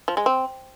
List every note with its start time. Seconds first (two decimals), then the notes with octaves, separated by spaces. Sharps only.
0.08 F3
0.17 G#3
0.26 C4